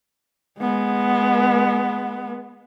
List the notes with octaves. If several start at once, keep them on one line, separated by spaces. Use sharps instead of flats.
G#3 B3